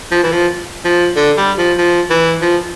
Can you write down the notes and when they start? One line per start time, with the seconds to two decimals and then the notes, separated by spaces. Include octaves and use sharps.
0.11 F3
0.23 E3
0.32 F3
0.85 F3
1.16 D3
1.37 G3
1.58 F3
1.78 F3
2.10 E3
2.41 F3